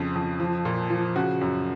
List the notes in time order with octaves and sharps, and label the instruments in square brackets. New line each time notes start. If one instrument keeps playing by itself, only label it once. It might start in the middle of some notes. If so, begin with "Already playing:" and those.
Already playing: [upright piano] F2 C#3 F3
F2
F3
A#2
F3
C#3 F#4
F#2